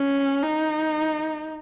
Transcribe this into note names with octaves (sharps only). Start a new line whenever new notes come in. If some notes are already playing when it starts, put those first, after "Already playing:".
Already playing: C#4
D#4